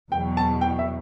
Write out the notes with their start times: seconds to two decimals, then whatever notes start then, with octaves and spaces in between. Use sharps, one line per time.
0.11 E2 B2 F#3 G5
0.37 A5
0.61 G5
0.79 E5